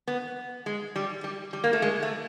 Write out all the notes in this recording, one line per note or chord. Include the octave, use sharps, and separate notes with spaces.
B3
G#3
G3
G3
G3
A#3
A3
G#3
A3